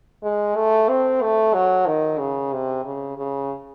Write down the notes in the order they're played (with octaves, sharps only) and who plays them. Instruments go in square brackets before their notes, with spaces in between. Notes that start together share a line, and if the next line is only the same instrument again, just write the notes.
[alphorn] G#3
A3
C4
A3
F#3
D#3
C#3
C3
C#3
C#3